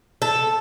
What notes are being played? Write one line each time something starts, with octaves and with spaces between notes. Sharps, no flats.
A4